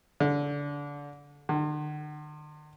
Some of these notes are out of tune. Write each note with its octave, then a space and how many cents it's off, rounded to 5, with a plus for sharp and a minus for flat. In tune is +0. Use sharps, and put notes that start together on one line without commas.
D3 -25
D3 +45